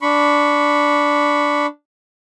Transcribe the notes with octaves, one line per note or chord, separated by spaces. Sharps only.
D4 B5 C#6